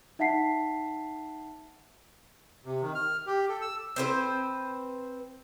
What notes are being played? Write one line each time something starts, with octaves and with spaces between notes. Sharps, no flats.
D#4 E5 F#5 A5 B6 C7
C3
D#3
F6
G4
A4
E6
C4 B4 C5